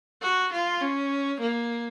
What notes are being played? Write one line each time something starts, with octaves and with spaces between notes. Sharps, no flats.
F#4
F4
C#4
A#3